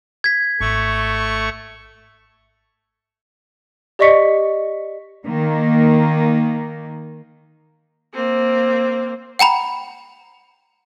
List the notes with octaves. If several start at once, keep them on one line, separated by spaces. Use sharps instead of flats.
G#6 B6
G#1 A3 C#6
G4 D5 D#5 C#6 B6 C#7
D#3 A#3
A#3 C4
F#5 G5 A#5 B5